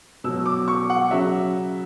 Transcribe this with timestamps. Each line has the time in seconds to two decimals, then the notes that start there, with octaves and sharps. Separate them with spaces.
0.24 B2 F#3 E6
0.46 D6
0.68 C#6
0.90 F#5
1.11 C#3 F#3 E5